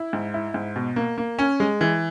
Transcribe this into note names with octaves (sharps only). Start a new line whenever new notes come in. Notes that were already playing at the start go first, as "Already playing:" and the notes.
Already playing: E4
G#2
E4
G#2
B2
A#3
A#3
C#4
G#3
E3